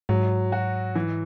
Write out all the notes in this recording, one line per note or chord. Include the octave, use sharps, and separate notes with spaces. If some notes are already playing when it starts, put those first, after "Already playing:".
G#2 F#3
F#4
E3